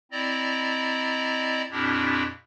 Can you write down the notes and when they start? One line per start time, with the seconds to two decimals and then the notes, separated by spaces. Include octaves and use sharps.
0.12 C4 E4 D5 D#5 A#5
1.71 F2 A#2 C4 D4 E4 G4